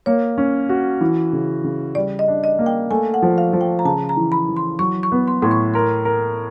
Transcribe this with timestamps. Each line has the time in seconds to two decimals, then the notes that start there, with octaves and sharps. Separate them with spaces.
0.06 A#3 C#5
0.38 C#4
0.69 F#4
1.01 E3
1.33 C#3
1.64 C#3
1.95 G3 D5
2.19 D#5
2.28 D4
2.44 D#5
2.59 A#3
2.66 G5
2.91 A3 G#5
3.14 F#5
3.22 F3
3.38 F5
3.53 F3
3.61 G5
3.79 A#5
3.85 C#3 A5
4.09 A#5
4.17 E3
4.32 B5
4.49 E3
4.57 C6
4.79 F#3 C#6
5.03 C#6
5.12 B3
5.28 C6
5.42 A2 C6
5.51 C#6
5.74 A#4 C6
6.05 A#4